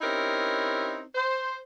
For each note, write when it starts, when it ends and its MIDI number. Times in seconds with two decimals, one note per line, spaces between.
0.01 1.02 60
0.01 1.02 61
0.01 1.02 63
0.01 1.02 64
0.01 1.02 67
0.01 1.02 70
1.15 1.57 72